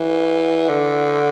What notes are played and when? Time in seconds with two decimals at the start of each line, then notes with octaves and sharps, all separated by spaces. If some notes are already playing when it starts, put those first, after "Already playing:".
Already playing: E3
0.69 D3